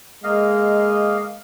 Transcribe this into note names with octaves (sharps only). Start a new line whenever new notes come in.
G#3 A#3 D#5 F5